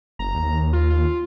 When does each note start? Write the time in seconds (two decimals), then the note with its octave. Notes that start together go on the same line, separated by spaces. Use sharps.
0.19 F#1 A#5
0.35 D#2
0.73 F4
0.90 F4